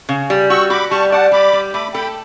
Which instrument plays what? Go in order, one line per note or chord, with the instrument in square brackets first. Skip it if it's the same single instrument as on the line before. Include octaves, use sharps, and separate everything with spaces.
[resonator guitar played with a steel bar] C#3
G3
[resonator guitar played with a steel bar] F#4 [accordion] C#6 E6
[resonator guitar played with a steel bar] F#4 [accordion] B5 D6
[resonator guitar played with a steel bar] G3 [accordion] A5 C#6
[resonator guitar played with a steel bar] D5 [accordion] F#5 A5
[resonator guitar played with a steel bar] G3 [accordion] B5 D6
[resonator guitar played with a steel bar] G3
[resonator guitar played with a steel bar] A3 [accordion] B5 D6
[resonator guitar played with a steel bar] A4 [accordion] G5 B5